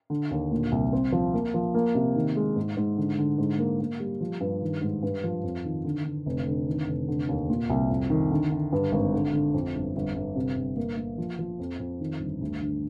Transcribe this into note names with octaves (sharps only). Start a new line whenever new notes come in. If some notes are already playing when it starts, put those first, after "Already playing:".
D3
D#2
A#2
C2
C4
F3
A#3
F3
A#3
C3
D#3
G#3
G#2
G#2
D3
D3
G#2
A#3
A#3
G3
F3
G2
D#3
G#2
G2
F3
F2
D#3
D3
D3
F1
D3
D#3
F1
D3
D#2
A#2
C2
F2
D#3
D3
D3
G2
G#1
D3
D3
F2
G1
G1
G1
C3
G1
A#3
A#3
F3
F3
F2
F2
D#3
G1
D2
D3